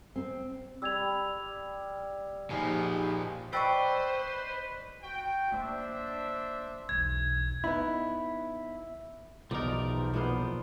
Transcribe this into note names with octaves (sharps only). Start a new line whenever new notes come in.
C4
G3 E6 G#6 F7
A#2 F3 D#4 G4 G#4 G#5 B5
B4 C5 D5 D#5 G5 B5 C#6 E6
F#4 G5
A#3 D4 C5 E5
B1 E2 G#6
B3 D#4 E4
B1 E2 F3 D#4 A#4 D5
A#2 B3 C5